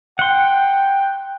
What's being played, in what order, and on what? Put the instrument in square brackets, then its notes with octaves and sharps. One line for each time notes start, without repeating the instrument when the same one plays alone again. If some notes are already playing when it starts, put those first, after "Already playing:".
[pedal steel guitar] F#5 C6 [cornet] G5